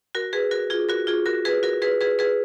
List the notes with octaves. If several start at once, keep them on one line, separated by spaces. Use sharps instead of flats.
F#4 A#4
G#4 B4
F#4 A#4
F4 G#4
F#4 A#4
F4 G#4
F#4 A#4
G#4 B4
F#4 A#4
G#4 B4
G#4 B4
G#4 B4